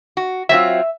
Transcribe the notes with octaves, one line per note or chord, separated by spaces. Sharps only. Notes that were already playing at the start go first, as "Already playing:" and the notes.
F#4
F#3 C4 F4 E5